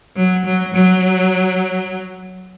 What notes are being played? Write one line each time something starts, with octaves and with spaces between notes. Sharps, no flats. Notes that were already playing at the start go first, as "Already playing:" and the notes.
F#3
F#3
F#3